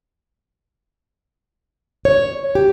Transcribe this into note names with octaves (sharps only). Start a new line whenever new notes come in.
C#5
G4